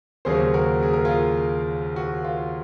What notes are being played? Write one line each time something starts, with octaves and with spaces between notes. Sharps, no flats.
D#2 C#3 F#3 A#3 C#4 G#4 C5
F#4 A#4
G#4
A#4
F4 G#4
F#4
F4